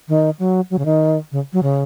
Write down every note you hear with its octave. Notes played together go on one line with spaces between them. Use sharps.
D#3
F#3
F#3
C#3
D#3
C#3
F#3
C#3